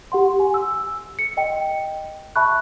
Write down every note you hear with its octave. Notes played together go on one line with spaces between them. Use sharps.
G4 F#5 C6
G#5
E6
C#7
D#5 G5
E5 A5 B5 C#6 F#6